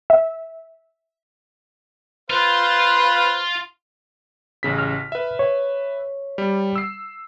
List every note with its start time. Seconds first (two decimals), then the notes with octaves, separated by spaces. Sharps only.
0.10 E5
2.30 F4 B4 C5 F5
4.63 A1 C#3 B6
4.78 F6
5.12 B4 E5
5.39 C#5
6.38 G3
6.76 E6 C7